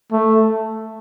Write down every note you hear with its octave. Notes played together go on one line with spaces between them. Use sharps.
A3